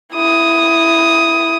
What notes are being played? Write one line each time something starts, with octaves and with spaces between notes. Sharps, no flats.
E4 D#6